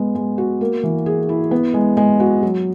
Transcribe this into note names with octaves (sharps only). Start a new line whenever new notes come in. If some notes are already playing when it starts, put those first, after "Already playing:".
Already playing: G#3 B3
G#3
F#4
A#3
E3
G#4
E4
B3
G#3
G#3
F#4
F#3